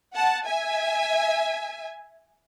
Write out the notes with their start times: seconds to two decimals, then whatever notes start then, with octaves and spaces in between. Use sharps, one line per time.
0.14 F#5 A5
0.47 E5 G#5